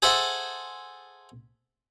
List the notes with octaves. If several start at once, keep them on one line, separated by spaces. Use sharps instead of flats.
G#4 A4 C5 E5 F#5 A5